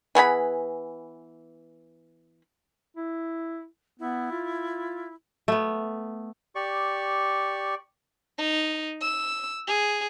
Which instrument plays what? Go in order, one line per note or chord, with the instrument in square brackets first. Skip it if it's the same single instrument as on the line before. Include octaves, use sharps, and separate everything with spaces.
[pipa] E3 B3 G#4 B5
[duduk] E4
[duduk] B3 [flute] E4
[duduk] F4
[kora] A3 B3
[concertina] G4 D5 C#6
[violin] D#4
E6
G#4